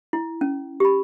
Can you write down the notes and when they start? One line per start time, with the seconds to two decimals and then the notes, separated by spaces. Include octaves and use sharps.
0.13 E4
0.41 C#4
0.80 G4 B5